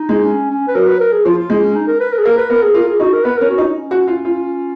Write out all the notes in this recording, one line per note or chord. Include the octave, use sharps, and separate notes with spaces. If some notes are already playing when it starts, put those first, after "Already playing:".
Already playing: D#4
G#3
C#4
C#4
B4
F#3 A#4
B4
A#4
G#4
F3 F4
F4
G#3
C#4
D#4
A#4
B4
A#4
G#4
A#3 A#4
B4
B3 A#4
G#4
F4 A#4
G#4
D#4 F#4
A#4
B3 B4
C#4 A#4
F#4
D#4
C#4
F#4
F4
F4